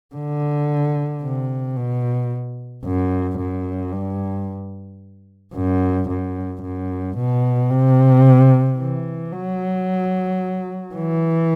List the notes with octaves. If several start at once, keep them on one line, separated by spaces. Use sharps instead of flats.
D3
C3
B2
F#2
F#2
G2
F#2
F#2
F#2
B2
C3
E3
F#3
E3